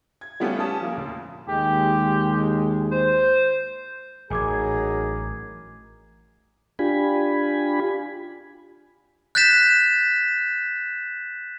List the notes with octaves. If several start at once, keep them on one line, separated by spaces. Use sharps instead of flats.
G#6
G3 A3 B3 C#4 F4 G4
C#4 G4 G#5 A5 D#6
F3 A#3
D2
D#2 G#3 G4
C5
A1 F#3 D#4 G#4 A#4 G#5 D6 G#6
D4 F4 G4 G#5 B5
F#6 G6 A6 B6 E7